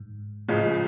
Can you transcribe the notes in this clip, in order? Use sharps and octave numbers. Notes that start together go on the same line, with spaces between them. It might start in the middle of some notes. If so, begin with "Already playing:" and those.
Already playing: G#2
C#2 A2 C#3 F3